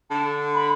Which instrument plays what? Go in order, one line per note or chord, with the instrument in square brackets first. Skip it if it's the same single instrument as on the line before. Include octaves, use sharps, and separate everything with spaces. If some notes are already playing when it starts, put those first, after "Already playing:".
[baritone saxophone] D3 [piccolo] A5
[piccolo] B5